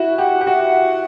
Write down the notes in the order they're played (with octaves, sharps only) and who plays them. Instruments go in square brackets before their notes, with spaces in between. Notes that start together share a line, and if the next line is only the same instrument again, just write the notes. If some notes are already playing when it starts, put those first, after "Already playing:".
Already playing: [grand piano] E4 F#4
[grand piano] G4 [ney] F#5
[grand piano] G4
[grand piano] F#4 [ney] F#5